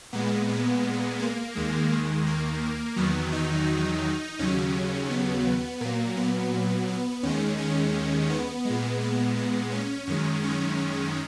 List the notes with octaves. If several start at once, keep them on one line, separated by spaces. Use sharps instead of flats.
A#2 G#3 B3
B3
A#3
D#2 D#3 G#3
G#3
A#3
E2 D#3 F#3 B3
D#4
D#2 C#3 F#3 C#4
B3
A#2 F#3 A#3
B3
B3
D#2 D#3 G#3 C#4
C#4
B3
A#2 G#3
B3
B3
C#4
F#2 D#3 G#3 C#4
C#4